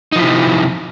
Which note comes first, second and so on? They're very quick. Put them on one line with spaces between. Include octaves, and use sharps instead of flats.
D#4 F3 E4 C3